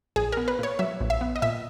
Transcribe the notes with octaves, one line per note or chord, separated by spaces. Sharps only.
A#1 G#4
B3 A#4
B4
A#2 C#5
F#3 E5
A#1
E5
B3
D#5
A#2 E5